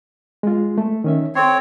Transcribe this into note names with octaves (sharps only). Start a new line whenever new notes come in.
G#3 F4
A3
D#3 C#4 E5
C4 A4 C#5 C6